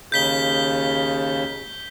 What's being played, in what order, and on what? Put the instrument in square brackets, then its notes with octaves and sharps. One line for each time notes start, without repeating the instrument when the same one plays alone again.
[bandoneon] D#2 C#3 [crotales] G6 B6 G7